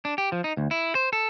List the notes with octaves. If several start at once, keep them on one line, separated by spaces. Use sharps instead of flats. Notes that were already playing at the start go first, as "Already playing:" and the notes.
D4
G4
F3
D#4
D2
E4
C5
A4